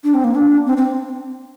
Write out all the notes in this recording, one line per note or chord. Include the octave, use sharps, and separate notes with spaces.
D4
C4
A#3
D4
C4
C4